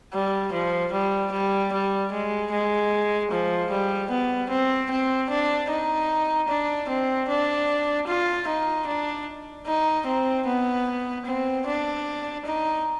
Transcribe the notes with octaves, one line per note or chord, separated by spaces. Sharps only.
G3
F3
G3
G3
G3
G#3
G#3
F3
G3
B3
C4
C4
D4
D#4
D4
C4
D4
F4
D#4
D4
D#4
C4
B3
C4
D4
D#4